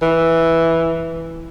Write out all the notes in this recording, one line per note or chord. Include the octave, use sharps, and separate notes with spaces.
E3